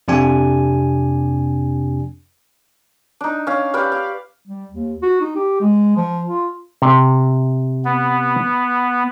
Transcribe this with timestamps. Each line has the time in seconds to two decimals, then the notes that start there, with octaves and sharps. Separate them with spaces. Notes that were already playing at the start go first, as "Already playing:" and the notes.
0.08 F2 C3 D4 G4 G#5
3.21 D4 D#4
3.47 C#4 F5
3.74 G4 B4 D5 F5
3.92 F5
4.47 G3
4.71 D#2
5.03 F#4
5.21 D#4
5.36 G4
5.61 G#3
5.97 F3
6.26 F4
6.82 C3
7.85 B3